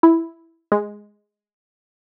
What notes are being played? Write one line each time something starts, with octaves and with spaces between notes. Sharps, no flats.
E4
G#3